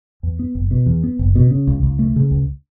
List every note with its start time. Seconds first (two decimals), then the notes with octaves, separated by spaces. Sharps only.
0.23 E2
0.39 B3
0.55 F#1
0.71 B2
0.86 E2
1.03 B3
1.19 F#1
1.35 B2
1.51 C#3
1.67 C#2
1.83 C#2
1.99 A3
2.16 C#3
2.31 C#2